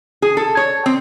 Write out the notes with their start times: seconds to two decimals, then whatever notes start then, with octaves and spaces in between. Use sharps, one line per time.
0.22 G#4
0.37 A4
0.57 C#5
0.86 C4